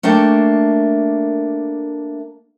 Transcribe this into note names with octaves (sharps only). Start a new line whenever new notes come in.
A3 A#3 D4 C#5 G5